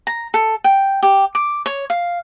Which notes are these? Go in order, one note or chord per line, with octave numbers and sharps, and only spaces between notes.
A#5
A4
G5
G4
D6
C#5
F5